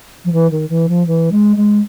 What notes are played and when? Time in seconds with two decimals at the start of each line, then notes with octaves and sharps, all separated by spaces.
0.25 F3
0.33 E3
0.51 D#3
0.69 E3
0.89 F3
1.07 E3
1.32 G#3
1.57 G#3